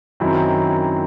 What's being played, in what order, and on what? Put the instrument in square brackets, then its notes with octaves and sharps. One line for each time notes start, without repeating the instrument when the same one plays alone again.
[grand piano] F#2 D#3 F#3 C4 E4